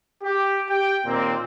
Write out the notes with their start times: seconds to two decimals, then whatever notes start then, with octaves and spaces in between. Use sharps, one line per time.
0.24 G4
0.70 G4 G5
1.05 D#2 A#2 A#3 C4